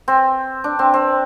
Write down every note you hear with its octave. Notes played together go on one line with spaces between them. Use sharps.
C4
D4
C4
C4